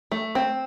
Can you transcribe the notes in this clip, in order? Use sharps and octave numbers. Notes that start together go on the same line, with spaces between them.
A3
C4